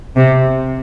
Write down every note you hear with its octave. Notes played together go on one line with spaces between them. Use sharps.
C3